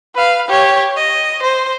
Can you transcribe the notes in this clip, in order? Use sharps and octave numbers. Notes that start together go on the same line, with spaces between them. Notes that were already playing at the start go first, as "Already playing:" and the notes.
B4 F5
G4 C#5
D#5
C5